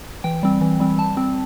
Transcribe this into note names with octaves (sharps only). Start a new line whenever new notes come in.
E3 G5
G3 C4
E3
G3 C4
G3 A5
C4